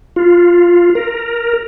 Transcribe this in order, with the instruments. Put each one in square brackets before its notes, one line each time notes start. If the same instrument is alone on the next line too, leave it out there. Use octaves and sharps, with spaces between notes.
[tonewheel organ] F4
A#4